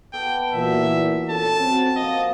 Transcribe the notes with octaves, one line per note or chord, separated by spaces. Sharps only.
B3 A4 D5 G5
A#2 E3 F#3 E5
C#4 A4 C#5 A5
F#3 C4 C#4
F3 A#3 D#5